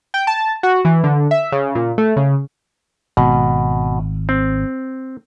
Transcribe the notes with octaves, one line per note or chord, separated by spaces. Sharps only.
G5
A5
F#4
E3
D3
E5
C#3
A#2
A3
C#3
G#1 B2
C4